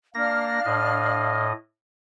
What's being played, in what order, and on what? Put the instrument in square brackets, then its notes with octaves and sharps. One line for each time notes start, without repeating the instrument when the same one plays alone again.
[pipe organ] A#3 A#6 [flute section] D4 F5 F6
[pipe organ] A2 D#5